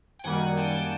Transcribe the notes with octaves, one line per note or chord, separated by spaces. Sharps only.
G5
F#2 D#3 G3 A#3 F#5 G#5
G5 A5